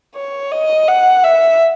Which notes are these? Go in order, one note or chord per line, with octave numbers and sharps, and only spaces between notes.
C#5
D#5
F#5
E5